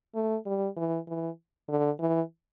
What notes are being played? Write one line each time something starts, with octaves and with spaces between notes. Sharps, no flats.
A3
G3
E3
E3
D3
E3